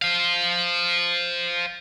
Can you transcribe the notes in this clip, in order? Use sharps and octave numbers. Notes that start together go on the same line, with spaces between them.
C5 F5